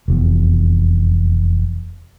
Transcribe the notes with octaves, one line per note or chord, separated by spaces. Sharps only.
F1 E2